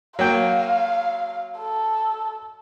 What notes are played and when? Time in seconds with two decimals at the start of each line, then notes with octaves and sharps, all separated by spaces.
0.19 F#3 A#3 F5 G5
1.59 A4